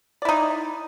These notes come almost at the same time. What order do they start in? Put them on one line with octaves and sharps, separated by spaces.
D5 E4 D#4